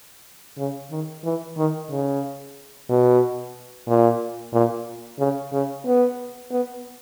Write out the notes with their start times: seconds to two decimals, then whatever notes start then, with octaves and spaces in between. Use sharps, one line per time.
0.58 C#3
0.91 D#3
1.24 E3
1.57 D#3
1.90 C#3
2.89 B2
3.88 A#2
4.53 A#2
5.19 C#3
5.52 C#3
5.86 B3
6.51 B3